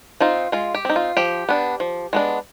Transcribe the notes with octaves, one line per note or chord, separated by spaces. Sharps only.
C4 D#4 F4
G#3 F4
G4
C4 D#4
F4
F3 G4
B3 D4
F3
G#3 B3 D4